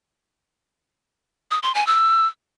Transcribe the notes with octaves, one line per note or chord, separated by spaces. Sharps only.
D#6
C6
G#5
E6